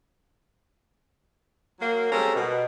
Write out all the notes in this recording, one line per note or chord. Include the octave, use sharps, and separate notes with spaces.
F#3 A#3
G3 G#3 C4 C#4 A4 A#4
B2